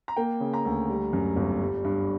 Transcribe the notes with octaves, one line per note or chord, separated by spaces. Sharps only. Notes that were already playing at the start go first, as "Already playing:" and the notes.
A#5
A#3 G5
C#3
A#5
D2
G3
F#2
G1
G3
G2